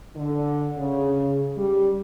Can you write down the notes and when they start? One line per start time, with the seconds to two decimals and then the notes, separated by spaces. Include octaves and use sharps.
0.16 D3
0.78 C#3
1.57 G3